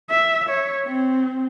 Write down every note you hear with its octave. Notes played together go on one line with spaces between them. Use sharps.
E5
C#5
C4